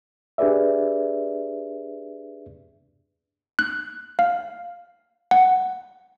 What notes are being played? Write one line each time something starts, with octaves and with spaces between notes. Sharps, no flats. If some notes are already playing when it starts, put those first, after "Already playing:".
D4 G4 G#4 B4 D5 E5
F#6
F5
F#5